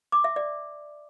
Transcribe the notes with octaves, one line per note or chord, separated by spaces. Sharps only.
D6
E5
D5